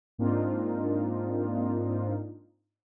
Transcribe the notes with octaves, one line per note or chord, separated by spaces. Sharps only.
G#2 A#3 C4 D4 D#4 F4